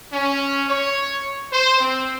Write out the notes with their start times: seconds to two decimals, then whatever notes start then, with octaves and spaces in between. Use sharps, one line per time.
0.13 C#4
0.68 C#5
1.52 C5
1.81 C4